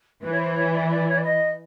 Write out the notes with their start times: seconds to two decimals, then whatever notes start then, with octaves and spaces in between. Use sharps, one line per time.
0.22 E3 B4
0.32 C#5
0.39 C5
0.56 C#5
0.73 D5
0.90 D5
1.09 C#5
1.17 D5
1.24 D#5